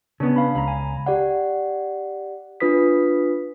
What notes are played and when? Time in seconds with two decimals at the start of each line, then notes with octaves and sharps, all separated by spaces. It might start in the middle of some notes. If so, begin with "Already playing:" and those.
0.20 C#3 B3 D4
0.36 F5 B5
0.55 C#2 A#5 B5
0.68 G#5
1.06 G4 D5 F#5
2.60 D4 F4 B4 D#6 B6